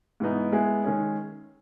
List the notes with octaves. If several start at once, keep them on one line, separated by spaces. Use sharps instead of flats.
G#2 E3 B3 D#4
G#3 B3 E4 G#4
D#3 G#3 C#4 G#4